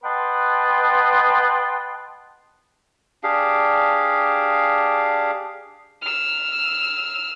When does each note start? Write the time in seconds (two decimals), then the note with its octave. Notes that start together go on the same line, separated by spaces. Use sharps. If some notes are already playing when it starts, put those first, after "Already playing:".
0.04 B4 D#5 F#5 G5 A5 C6
3.24 D4 G4 G#4 F5
6.02 E6 F6